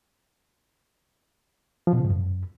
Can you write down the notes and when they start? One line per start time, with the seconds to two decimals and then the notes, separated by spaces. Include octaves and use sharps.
1.87 F3
1.93 B2
1.99 C#3
2.05 G#2
2.10 F#2